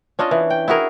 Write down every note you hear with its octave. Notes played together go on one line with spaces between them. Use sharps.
C#4 D4 F4 D#5
E3
G5
E4 F#4 G#4 A#4